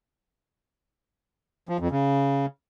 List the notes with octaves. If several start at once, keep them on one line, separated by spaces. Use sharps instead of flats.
F3
F2
C#3